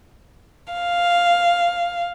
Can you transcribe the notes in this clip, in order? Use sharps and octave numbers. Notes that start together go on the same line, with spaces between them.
F5